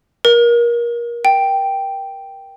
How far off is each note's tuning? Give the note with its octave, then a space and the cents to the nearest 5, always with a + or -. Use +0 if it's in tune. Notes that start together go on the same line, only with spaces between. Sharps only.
A#4 +25
G5 -5